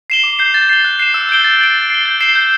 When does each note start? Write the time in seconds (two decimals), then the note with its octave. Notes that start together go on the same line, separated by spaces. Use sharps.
0.10 C7 E7 G7
0.24 D6
0.39 G6 C7
0.54 A6
0.69 C7 G7
0.85 F#6
0.99 C7 E7
1.14 E6
1.29 G6 D7 G7
1.44 A6
1.60 D7 F#7
1.74 A6
1.90 C7 G7
2.05 G6
2.21 C7 E7 G7
2.35 G6